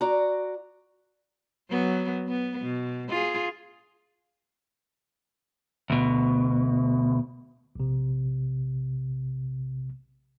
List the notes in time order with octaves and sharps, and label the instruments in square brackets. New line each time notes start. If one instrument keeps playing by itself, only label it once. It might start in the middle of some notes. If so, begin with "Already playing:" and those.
[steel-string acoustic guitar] F#4 D5 A#5
[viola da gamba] F#3 B3
B3
B2
F4 G#4
[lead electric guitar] D2 B2
[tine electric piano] A#1 C3